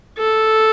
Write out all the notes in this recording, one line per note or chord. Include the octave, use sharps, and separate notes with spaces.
A4